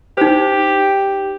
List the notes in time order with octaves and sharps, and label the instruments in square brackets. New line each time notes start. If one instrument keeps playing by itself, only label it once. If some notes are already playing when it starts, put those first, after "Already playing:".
[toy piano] D#4 C5 [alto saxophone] G4